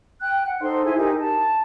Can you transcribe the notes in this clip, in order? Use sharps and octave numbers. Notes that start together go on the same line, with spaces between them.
G5 F#6
F#5
D#4 A4 C5 C6
E4 G#4 G#5
D#4 G4 A#4 G#5
A5